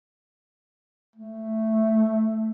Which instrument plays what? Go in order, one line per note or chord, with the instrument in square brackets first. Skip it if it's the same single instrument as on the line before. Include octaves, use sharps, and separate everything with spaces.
[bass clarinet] A3